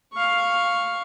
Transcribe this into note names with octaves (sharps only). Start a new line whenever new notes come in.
F5 C#6